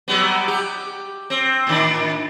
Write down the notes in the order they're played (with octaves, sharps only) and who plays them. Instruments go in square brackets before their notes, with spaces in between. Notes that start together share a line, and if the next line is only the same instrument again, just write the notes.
[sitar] F#3 G3 B3
G4
C4
A2 D#3 D4